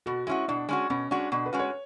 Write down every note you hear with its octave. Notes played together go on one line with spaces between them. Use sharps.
B2 F#4
G#3 C#4 E4 F#4
B2 D4
G#3 C#4 F#4
B2 C#4
G#3 C#4 D4 F#4
B2 D4
B4
G#3 C#4 F#4
C#5